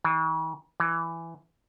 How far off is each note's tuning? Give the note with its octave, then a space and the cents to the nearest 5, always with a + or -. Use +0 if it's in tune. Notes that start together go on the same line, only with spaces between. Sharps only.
E3 -45
E3 +10